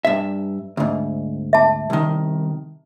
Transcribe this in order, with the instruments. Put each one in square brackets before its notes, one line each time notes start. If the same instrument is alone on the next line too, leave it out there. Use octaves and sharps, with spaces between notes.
[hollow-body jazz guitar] G2 E5
D2 G#2
[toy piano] E5 A5
[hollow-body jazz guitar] C2 D#3